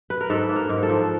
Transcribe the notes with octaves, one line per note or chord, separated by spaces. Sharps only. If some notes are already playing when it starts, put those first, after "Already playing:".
B4
A#4
G#2 A4
A#3
A#4
G#2
A4
F3